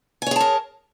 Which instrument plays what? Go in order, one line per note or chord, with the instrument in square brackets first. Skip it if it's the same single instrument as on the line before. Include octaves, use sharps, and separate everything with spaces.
[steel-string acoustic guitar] G#5
C#5
G#4
A5
A#4